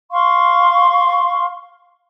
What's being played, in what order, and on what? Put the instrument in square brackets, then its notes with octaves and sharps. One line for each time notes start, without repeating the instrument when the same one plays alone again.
[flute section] F5 C6 C#6